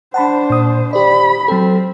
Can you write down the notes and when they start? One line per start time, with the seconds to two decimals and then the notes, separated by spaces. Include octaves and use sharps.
0.14 D4 C5 F#5 A5 B5
0.50 A#2 D#6
0.93 G4 C5 D5 B5
1.48 F#3 C4 A4